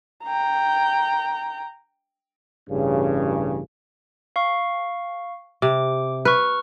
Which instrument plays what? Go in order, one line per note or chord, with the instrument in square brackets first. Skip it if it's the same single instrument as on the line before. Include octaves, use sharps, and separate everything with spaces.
[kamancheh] G5 A#5
[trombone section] A1 G2 C#3
[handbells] F5 C#6
[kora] C3 [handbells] D6
[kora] B4 [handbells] C#6 F6